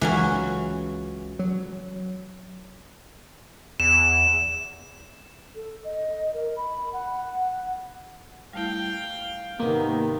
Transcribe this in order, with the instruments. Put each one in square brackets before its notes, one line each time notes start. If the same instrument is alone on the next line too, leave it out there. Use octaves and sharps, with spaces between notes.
[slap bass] C#2 [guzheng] E3 F#3 C#4
[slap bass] F#3
[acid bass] E2 [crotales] E7
[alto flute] A4
D#5
A#4
B5
F#5
[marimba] G3 A3 E4 [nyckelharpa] F5 G5
[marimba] G#2 D#5 F#5 [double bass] C3 D#3 [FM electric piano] A#3 [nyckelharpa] B3